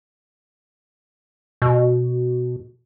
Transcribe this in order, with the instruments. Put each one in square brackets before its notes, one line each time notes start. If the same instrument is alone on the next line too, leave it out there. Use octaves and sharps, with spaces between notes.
[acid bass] B2